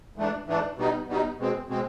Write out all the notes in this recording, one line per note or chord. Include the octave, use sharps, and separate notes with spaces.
G#2 E3 A3 D4
G#2 E3 A3 D4
B2 G3 B3 D#4
B2 G3 B3 D#4
B2 G#3 C4
B2 G#3 C4